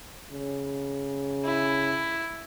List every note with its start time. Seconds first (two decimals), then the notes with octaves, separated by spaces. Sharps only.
0.32 C#3
1.45 E4